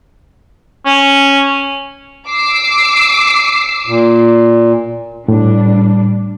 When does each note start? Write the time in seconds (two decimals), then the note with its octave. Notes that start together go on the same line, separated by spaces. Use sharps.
0.86 C#4
2.28 D6 E6 C7
3.87 A#2
5.28 A2 G3 D4